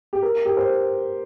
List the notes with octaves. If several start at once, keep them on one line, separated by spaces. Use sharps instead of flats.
G4
A#4
G4
C5